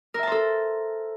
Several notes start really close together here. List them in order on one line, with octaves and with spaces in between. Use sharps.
A#4 E5 A5 C5 A4